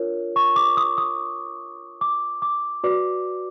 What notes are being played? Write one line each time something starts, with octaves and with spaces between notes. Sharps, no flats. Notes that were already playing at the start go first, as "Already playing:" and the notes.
Already playing: D4 F4 A#4 C#5
C#6
D6
D#6
D#6
D6
D6
F#4 B4 D5 D6